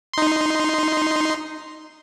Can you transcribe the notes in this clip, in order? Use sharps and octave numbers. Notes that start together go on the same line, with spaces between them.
D#4 C6